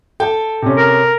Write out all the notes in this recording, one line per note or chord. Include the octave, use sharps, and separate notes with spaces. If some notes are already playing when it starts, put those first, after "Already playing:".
A4 G5
C3 C#4
A#4